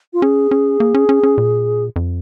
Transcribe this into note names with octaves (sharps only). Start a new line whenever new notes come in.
F4
C#4 G#4
C#4
A#3
C#4
C#4
C#4
A#2
F2